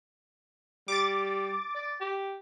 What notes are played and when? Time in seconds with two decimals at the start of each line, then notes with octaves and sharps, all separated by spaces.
0.88 G3 D6 A6
1.75 D5
2.00 G4